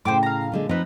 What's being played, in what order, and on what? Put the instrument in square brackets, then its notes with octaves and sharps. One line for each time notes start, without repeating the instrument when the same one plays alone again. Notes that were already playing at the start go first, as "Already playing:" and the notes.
[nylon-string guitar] A2 C#3 [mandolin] C5 G5 D6
[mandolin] F5 A#5
[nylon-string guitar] A#2 D3 G#3
[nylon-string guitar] F3 C4 D#4 [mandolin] B4 A#5